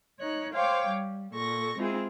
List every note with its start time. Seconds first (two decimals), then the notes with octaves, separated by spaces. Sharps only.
0.21 D#4 C#5 F#6
0.54 C5 C#5 F5 G5 D6
0.88 G3
1.32 A#2 A4 C#6 A#6
1.78 G#3 C4 E4 F4 G#4